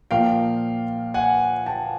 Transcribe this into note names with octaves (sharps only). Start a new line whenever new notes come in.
A#2 F3 A#3 F5 G5
F#5 G#5
G5 A5